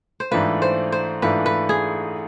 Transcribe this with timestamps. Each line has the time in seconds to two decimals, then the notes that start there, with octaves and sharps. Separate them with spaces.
0.20 C5
0.31 G#2 E3 A3 D4 F4 B4
0.62 C5
0.92 C5
1.22 G#2 E3 A3 D4 F4 B4
1.46 B4
1.69 G#4